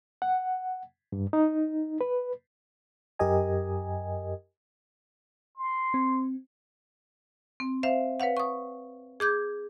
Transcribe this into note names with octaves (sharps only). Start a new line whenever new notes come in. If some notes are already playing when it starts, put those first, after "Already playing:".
F#5
G2
D#4
B4
F#2 G4 A#4 D#5 G#5
C6
C4
C4
C5 E5 F5
B4 C#5 F5 F#5
C#6 D#6
G#4 D6 G6 G#6